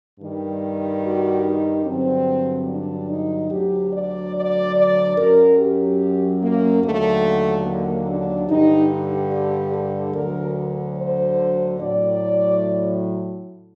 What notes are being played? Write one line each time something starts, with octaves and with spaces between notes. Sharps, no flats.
G2 D#3 G3
F#4
D#4
G2 D3 F#3 C4
D4
D#4
D2 D3 F#3 G4
D5
D5
D5
F#2 F#3 A#4
G4
A#3
D#2 D3 F#3 A3
A#3
D4
G2 D3 G3 D#4
G4
A4
D2 D3 F#3 A#4
C5
A2 F#3 D5